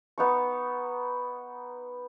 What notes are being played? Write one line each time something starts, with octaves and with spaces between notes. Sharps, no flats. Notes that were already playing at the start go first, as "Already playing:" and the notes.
B3 D#4 C#6